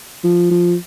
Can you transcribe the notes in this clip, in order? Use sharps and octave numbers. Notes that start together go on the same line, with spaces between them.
F3
F3